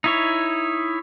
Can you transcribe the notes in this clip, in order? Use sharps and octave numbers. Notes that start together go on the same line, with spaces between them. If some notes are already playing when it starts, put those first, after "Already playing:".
D#4 E4 C#5